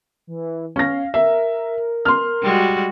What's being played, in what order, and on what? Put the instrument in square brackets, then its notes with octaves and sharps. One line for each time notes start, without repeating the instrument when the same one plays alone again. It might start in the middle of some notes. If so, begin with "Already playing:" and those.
[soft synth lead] E3
[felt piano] C#4 A#6 [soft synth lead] F5
[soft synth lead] A#4 [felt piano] E5
[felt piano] C6 F6
[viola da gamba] G3 G#3 F#4